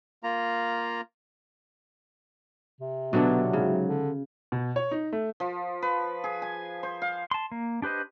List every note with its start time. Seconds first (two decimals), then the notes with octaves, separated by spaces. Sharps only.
0.23 A#3 F4 A#5
2.81 C3
3.13 B2 D3 F#3 B3 D4
3.53 G#2 C#3
3.86 D3
4.52 B2
4.76 C#5
4.91 D#4
5.13 A3
5.40 F3
5.82 B4
6.24 G#4
6.42 G#5
6.83 C5
7.02 F5
7.31 A5 C6
7.52 A#3
7.82 D4 G4 B4 C5 D#5